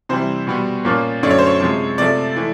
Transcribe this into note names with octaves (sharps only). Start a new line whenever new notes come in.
C3 E3 G3 C5
B2 G3 B3
A#2 F3 A#3 C#4 F4
F#2 D3 F#3 A3 C#4 D5
C#5
C5
C#5
C3 F3 G#3
C3 F3 A3 D5
E3 A3